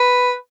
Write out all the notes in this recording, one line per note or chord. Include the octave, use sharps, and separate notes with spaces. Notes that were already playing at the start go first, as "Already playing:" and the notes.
Already playing: B4